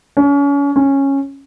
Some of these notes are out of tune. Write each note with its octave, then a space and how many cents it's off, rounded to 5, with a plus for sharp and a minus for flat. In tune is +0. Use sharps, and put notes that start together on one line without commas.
C#4 +35
C#4 -10